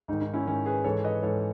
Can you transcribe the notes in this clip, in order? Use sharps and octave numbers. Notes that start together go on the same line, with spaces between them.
G#2 D#3 D#4
D#4
C#4 E4
G#2 D#3 C#4
G#4 B4
G#2 E3 A4 C#5
B4 D#5
G#2 E3 A4 C#5